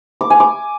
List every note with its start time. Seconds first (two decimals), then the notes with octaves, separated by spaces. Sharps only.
0.21 D6
0.30 G#5
0.40 D6